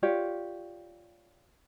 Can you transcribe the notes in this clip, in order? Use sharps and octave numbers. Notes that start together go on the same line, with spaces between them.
F4 G4 C#5 D5